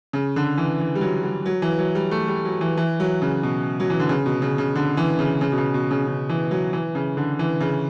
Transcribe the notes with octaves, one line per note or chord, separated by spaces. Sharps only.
C#3
D3
E3
E3
G3
F#3
G3
F#3
E3
F#3
G3
A3
G3
F#3
E3
E3
F#3
C#3
B2
F#3
E3
D3
C#3
B2
C#3
C#3
D3
E3
C#3
C#3
B2
C#3
B2
C#3
C#3
E3
F#3
E3
C#3
D3
E3
C#3